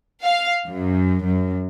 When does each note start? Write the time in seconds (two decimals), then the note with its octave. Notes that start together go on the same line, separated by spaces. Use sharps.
0.24 F5
0.66 F#2
1.24 F#2